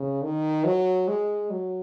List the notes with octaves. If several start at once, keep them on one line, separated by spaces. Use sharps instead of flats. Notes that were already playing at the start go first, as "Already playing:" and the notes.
Already playing: C#3
D#3
F#3
G#3
F#3